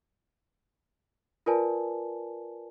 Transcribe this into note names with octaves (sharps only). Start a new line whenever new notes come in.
F4 A#4 B4 D5 G#5 A5